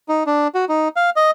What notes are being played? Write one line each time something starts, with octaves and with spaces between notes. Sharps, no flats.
D#4
D4
F#4
D#4
F5
D#5